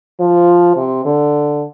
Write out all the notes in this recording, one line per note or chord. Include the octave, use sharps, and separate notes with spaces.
F3
C3
D3